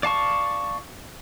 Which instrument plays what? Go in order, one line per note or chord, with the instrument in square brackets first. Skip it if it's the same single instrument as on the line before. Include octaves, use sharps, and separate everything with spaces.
[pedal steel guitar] D5 F5 A5 C#6